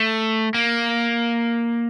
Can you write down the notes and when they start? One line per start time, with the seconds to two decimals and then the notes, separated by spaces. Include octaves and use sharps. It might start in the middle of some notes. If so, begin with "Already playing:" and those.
Already playing: A3
0.54 A#3